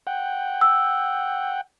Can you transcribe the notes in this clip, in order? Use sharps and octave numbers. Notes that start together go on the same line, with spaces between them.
F#5 G5
E6